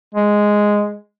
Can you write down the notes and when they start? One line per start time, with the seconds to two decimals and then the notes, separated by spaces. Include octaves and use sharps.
0.15 G#3